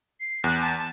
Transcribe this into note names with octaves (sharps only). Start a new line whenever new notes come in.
C7
E2 F#6
A5
A5